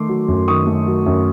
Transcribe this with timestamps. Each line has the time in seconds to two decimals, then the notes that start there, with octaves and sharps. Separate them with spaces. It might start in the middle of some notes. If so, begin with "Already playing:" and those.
Already playing: D#3 A3 C6 D6
0.09 F#3
0.28 F#2
0.48 D#3 C#6 D#6
0.67 A3
0.87 F#3
1.06 F#2